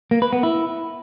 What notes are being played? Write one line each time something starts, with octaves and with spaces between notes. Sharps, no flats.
A#3
B4
B3
E4